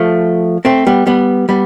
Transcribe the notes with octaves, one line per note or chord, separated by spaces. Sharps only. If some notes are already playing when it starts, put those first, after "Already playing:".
Already playing: F3 A3
A3 C4
G3 B3
G3 B3
G3 B3